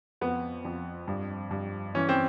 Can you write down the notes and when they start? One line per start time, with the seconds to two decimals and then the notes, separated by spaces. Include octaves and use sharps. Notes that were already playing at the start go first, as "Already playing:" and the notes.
0.21 F2 B3
0.65 F2
1.08 G2
1.51 G2
1.95 E3 C#4
2.09 C4